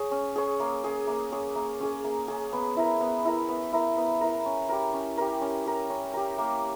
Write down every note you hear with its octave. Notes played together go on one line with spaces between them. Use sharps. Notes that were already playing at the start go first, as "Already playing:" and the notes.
Already playing: G#4 C#5
C#4
G#4 C#5
A#3
C#4 G#4
A#3
C#4 G#4
A#3
C#4 G#4
A#3
C#4 G#4
B3
E4 A#4
B3
E4 A#4
B3
E4 A#4
B3
E4 A#4
C#4
G4 A#4
C#4
G4 A#4
C#4
G4 A#4
C#4
G4 A#4
A#3